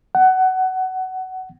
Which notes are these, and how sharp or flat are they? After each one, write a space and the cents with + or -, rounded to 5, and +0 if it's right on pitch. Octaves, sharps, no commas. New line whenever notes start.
F#5 +20